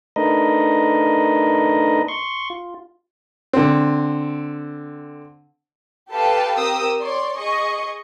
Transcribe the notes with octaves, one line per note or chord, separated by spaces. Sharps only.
A3 D4 D#4 A#4 B4 D#5
C6 C#6
F4
D3 C4
G4 A4 B4 F5 G5 A5
C4 G4 A#4 D#6 E6
C#5 D5 C6
G#4 D#5 C#6